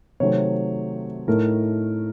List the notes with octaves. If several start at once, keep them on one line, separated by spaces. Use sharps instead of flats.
C3 D#3 F#3 A3 C4 C#5
A2 A3 D#4 A#4